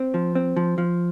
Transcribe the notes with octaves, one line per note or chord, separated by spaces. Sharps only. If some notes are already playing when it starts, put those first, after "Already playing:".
Already playing: C4
F3
C4
F3
F3